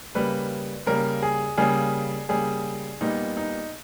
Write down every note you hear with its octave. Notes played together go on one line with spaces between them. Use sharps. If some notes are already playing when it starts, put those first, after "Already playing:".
C#3 G3 A#3 B4
C#3 G3 A#3 A#4
G#4
C#3 G3 A#3 G#4
C#3 G3 A#3 G#4
A#2 G3 B3 D#4
D#4